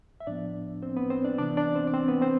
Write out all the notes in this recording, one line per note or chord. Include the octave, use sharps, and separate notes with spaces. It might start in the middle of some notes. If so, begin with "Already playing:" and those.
E5
A2 F3 B3 D4 D5
C4 C5
B3 B4
C4 C5
D4 D5
C3 E3 B3 D4 D5
D4 D5
C4 C5
D5
C4 C5
B3 B4
C4 C5